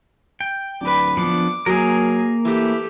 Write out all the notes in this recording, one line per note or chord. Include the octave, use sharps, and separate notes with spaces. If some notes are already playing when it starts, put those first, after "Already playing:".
G5
D1 B4 D5
F3 B3 D4 D6
F#3 A#3 G#4 A#4
E3 A3 G4